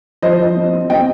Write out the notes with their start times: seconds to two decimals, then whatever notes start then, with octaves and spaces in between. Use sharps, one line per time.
0.22 F3 C5 D#5
0.40 F3
0.56 C4
0.73 C4
0.90 C4 D#5 G5